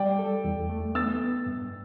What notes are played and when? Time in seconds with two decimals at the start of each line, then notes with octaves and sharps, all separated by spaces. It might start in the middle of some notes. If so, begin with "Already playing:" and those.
Already playing: G3 D5 G5
0.19 A4
0.44 E2
0.70 A3
0.95 B3 E6 A6
1.21 B3
1.46 G2